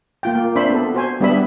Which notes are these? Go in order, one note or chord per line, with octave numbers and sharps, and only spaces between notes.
A#3 F4 G5
A#3
C4 D4 C5 E5 B5
B3 A4
F#4 C5 G#5
G3 B3 D4 G4 E5 B5